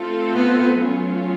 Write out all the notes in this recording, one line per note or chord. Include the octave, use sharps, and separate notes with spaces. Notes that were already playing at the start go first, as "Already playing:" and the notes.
Already playing: A3 C4 F4 A4
B3
F#3 A3 C#4 F4